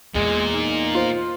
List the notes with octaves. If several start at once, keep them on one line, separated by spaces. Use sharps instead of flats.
E2 A#2 G#3
D#4
F4 C5